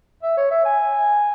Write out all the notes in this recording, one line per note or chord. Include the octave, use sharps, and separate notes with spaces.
E5
C#5
E5
G#5